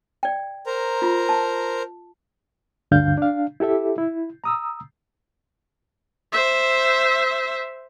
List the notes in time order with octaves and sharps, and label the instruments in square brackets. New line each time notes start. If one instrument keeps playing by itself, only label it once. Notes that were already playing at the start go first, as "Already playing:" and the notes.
[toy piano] D5 G5
[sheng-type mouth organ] A#4 C5 A#5
[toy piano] F4
A5
[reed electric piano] D2 G2 D3 D4 F5 G6
D4 F5
E4 G4 A4 E5
E4
A#5 D#6 E6
[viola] C5 E5